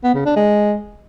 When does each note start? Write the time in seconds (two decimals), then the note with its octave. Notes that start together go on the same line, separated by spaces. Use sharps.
0.04 B3
0.15 C#3
0.25 D4
0.36 G#3